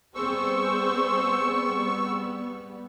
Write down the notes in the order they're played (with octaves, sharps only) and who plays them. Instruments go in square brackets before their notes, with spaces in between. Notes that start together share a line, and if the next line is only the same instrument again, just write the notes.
[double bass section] G3 B3 [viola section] C4 G#4 C5 [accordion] C#6 E6